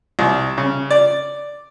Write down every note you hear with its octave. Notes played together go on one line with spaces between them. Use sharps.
C2
C#3
D5